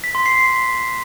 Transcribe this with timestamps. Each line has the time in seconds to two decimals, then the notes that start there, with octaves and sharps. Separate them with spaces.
0.04 B6
0.15 C6
0.26 C7